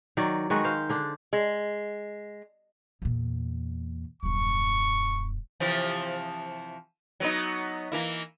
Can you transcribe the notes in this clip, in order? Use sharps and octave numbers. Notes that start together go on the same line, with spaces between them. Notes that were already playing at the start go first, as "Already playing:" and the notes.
D#3 F#3 D5
D#3 G#3 F#4 B4
C5 F5
D3 D4
G#3
E2 A#2
D#1 F#2 C#6
C3 E3 F3
F#3 B3 D#4
E3 A#3 E4